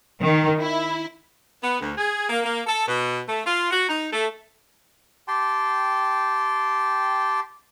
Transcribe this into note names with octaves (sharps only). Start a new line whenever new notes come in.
D#3
E4
B3
D2
G#4
A#3
A#3
A4
B2
A3
F4
F#4
D#4
A3
G4 G5 A5 C6